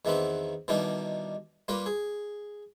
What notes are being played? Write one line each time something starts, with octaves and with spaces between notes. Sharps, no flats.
E2 D#3 E3 B3 C4 B5
B2 D#3 E3 G3 D4 D#4
G3 A#3 F4 A#4 B4
G#4